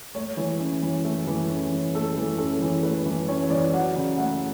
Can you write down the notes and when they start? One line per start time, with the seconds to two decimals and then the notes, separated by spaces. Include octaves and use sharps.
0.15 A3 C#5
0.37 E3
0.60 C#4
0.83 E3
1.05 A3
1.27 E3
1.50 C#4
1.72 E3
1.94 A3 A4
2.17 E3
2.38 C#4 A4
2.62 E3
2.83 A3 B4
3.06 E3
3.28 C#4 C#5
3.50 E3 D5
3.73 F#3 F#5
3.95 C#3 F#5
4.18 A3 F#5